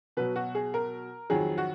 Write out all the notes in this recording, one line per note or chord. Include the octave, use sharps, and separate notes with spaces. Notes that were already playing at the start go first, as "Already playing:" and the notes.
B2 F#3 B4
F#4
G#4
A#4
F2 D#3 F#3 G#4
F#4